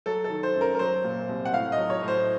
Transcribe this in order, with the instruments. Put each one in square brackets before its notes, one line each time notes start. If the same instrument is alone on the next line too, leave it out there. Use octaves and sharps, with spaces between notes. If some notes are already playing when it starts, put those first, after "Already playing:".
[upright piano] F#3 A4
A4
D#3
C5
F#2
A#4
A#4
F#3 C5
A#2
C2
F#5
A2 F5
D#5
F#3
C#5
A2
C5